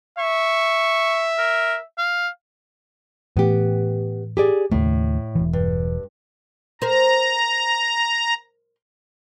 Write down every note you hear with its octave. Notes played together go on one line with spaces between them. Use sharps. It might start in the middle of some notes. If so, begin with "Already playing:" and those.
E5 C#6
A#4
F5
A2 E3 B3 G4
G4 G#4 D5
D#2 A2 C#3 A3
E1 E3
G2
A#4 C5 A#5